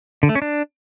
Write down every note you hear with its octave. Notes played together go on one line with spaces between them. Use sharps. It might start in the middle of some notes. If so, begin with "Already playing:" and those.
D3
A3
C#4
D4